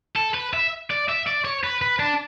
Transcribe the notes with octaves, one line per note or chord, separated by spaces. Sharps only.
A4
B4
E5
D5
E5
D5
C#5
B4
B4
D4